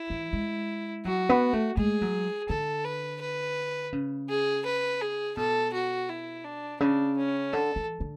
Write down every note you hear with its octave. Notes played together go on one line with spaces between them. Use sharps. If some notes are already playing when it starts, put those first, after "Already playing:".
Already playing: E4
E3
G#3
F#3 F#4
B3
A3
G#3 G#4
F#3
D3 A4
B4
B4
C#3
G#4
B4
G#4
B2 A4
F#4
E4
D4
C#3 D4
C#4
D3 A4
E3
D3